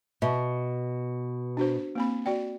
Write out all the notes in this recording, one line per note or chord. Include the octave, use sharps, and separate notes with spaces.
B2 E5
D4 F#4 C5
A#3 C4 B5
F#4 D5 G5